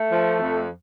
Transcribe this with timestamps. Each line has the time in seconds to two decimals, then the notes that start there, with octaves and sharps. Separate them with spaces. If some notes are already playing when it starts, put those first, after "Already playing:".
Already playing: A3
0.11 F3
0.40 F2